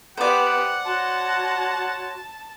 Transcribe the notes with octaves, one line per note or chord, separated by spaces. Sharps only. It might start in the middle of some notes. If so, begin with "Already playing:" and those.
B3 G4 C5 D5 F#5
F#4 C#5 A5 C6